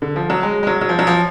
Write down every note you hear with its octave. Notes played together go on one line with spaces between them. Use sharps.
D3
F3
F#3
G#3
G#3
F#3
F#3
F3
F#3
F3